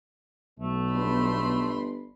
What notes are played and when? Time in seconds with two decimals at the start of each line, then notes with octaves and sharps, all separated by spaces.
0.59 B1 A3
0.94 G1 B5 C6